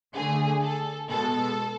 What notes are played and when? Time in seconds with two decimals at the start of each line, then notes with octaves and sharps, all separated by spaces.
0.15 D3 A3 G#4
0.62 A4
1.10 B2 G#3 A4